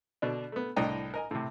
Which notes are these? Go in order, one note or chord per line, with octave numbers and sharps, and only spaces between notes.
B2 D3 D4
A3 B3
C2 A2 D4 D#5 G5 A#5
A#4 D#5 G#5
A2 C3